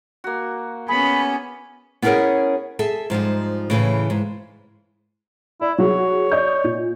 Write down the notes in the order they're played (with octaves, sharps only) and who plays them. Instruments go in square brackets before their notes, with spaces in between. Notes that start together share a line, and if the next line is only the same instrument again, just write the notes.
[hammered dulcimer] A#3 F#4
[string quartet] B3 C#4 [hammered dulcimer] G#4 [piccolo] B5
[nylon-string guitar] B3 C#4 E4 G#4 A#4 C#5
G#4 A4 E5
G#2 F3 G3 D#4
A2 C#3 E3
G#2
[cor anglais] E4 [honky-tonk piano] D5
[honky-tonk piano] F#3 F#4 G#4 [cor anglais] C#5
[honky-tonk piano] D5 D#5 G6
A#2